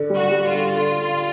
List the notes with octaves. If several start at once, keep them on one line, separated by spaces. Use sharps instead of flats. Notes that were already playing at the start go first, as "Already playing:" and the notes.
Already playing: D3
G3
F#4
G3
F4
D3
D3 F4
D3